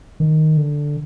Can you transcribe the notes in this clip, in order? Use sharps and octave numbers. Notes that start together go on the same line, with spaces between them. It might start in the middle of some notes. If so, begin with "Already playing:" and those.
D#3
D3